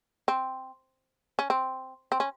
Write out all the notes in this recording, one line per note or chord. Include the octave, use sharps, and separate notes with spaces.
C4
C#4
C4
C4
C#4